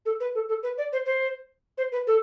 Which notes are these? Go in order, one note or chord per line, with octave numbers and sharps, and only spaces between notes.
A4
B4
A4
A4
B4
D5
C5
C5
C5
B4
A4